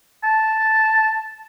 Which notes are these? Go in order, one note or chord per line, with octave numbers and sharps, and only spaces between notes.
A5